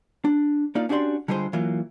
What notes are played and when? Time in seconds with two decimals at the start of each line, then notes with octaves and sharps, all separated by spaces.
0.25 D4
0.75 A#3 D#4 F4 D5 F5
0.89 C#4 D4 F#4 G4 D5 C6
1.28 D3 G3 G#3 F4 G#4 C5
1.53 E3 F#3 A#3 F4